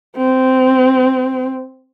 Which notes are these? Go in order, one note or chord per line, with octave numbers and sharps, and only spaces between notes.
C4